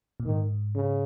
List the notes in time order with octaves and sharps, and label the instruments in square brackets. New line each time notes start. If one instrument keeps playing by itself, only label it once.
[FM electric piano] A#2
[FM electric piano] G#2 [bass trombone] D#3
[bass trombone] C#3